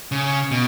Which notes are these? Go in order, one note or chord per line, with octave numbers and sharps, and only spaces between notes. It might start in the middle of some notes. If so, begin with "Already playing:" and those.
C#3
B2